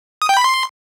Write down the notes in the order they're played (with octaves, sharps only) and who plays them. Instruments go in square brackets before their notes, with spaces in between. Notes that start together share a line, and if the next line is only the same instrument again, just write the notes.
[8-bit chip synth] D#6
G5
B5
C6